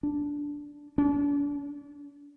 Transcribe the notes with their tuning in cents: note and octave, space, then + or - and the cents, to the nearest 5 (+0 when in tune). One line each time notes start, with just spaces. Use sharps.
D4 -10
D4 -45